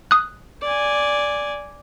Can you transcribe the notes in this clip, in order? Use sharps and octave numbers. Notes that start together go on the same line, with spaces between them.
D#6 F#6
D5 G#5